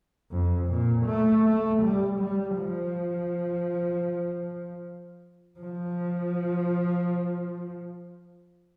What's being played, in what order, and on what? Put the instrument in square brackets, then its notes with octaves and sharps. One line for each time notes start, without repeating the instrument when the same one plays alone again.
[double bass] F2
A#2
A3
A3
G3
G3
F3
F3